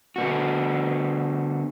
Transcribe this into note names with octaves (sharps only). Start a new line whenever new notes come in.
D3 B3 F#4